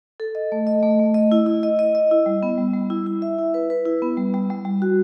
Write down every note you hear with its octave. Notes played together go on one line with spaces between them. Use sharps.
A4
D#5
A3
D#5
A3
A3
D#5
E4
E4
D#5
D#5
D#5
E4
G3
B3
G3
G3
E4
E4
E5
E4
B4
B4
E4
B3
G3
G3
G3
G3
F#4